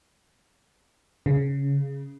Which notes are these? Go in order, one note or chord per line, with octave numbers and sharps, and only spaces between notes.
C#3